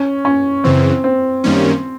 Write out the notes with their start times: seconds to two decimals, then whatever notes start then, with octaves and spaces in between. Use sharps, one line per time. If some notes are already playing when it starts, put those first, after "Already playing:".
Already playing: C#4
0.25 C#4
0.64 F#2 C#3 E3 C4
1.04 C4
1.44 F#2 D#3 G3 A#3 C#4